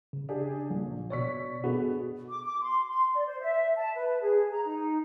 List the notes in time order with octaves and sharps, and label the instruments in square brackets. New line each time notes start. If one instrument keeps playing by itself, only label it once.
[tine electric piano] C#3
[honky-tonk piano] D4 G4 G#4
A#1
[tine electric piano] B2 C#5 [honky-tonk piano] D5 C#6 B6
[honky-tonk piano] B2 B3 [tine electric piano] F#4 G#4 A4
[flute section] D6
D6
C6
C6
D5
C5
E5
A5
B4
G#4
A#5
D#4